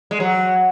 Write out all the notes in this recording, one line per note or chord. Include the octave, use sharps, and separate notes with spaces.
G#3
F#3